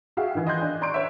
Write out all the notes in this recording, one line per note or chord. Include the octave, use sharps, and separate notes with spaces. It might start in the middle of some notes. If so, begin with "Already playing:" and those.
F#4 G#4 E5 F5 G5
D#3 E3
D#5 G5 G#5 C6 F#6 G6
D4
D5 A#5 C6 C#6 G6 D7
C#5 E5